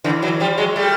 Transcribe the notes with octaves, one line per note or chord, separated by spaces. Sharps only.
D3 E3
E3 F#3
F3 G3
F#3 G#3
G3 A3